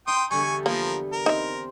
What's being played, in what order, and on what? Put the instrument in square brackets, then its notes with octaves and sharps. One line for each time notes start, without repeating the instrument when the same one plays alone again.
[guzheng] D#4 [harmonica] G5 C6 D#6
[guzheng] E2 D3 G3 [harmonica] G#5 C#6
[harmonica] F3 A#4 [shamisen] A#3 [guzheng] B3
[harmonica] A#4
[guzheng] C4 [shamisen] D#4 E5